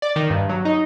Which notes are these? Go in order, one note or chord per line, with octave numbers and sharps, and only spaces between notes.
D5
D#3
G2
F#3
D#4